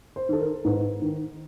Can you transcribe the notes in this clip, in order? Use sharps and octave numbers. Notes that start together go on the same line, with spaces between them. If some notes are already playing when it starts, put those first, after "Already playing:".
C5
D#3 A4
A#4
G#2 B4
D#3